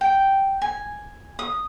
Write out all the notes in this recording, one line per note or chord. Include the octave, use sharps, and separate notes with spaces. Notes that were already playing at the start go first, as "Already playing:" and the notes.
G5
G#5
D#6